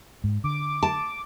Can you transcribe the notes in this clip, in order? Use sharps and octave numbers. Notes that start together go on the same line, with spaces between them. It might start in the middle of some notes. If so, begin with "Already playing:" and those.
G#2
D3 D6
A5